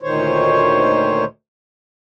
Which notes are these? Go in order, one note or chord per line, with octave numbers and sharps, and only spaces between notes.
D2 A#2 D#3 C5 C#5